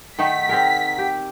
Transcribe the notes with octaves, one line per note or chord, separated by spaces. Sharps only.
D#3 A3 D#4 F#5 B6
C4 G#4 A#4
G4